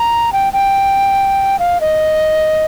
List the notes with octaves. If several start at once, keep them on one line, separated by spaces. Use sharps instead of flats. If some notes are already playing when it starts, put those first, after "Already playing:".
Already playing: A#5
G5
G5
F5
D#5